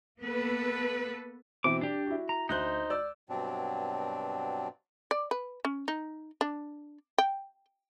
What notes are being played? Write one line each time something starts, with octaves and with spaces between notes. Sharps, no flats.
A#3 B3 A4 B4
B2 E3 C4 D6
D4 G4 D5
E4 F#4
A#5
D2 D#4 C5 F#6 G6
D5 D6 E6
G2 B2 F#3 C4 D4
D5
B4
C#4
D#4
D4
G5